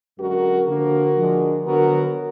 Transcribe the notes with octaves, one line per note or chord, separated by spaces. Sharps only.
F#2 D3 G#3 F#4 A#4
D3 F3 A#3 F#4 A#4
D3 F3 G#3 D4
D3 F#3 B3 F#4 A#4